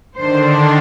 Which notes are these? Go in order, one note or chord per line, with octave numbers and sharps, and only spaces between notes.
D3 D#3 D4 C5